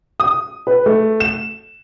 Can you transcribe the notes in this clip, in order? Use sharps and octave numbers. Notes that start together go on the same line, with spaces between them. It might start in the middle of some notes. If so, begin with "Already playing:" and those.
D#6
B4
A3
E7